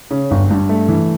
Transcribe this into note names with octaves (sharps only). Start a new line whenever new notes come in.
C#3
G1
G2
A3
E3